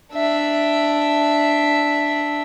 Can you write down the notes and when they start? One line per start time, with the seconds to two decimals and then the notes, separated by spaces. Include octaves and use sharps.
0.13 D4 E5